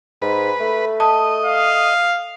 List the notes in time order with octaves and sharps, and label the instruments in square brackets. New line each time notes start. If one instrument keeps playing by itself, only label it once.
[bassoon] G#2 [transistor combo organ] B4
[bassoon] A3
[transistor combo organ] D#5 [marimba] A5 D#6
[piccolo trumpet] F5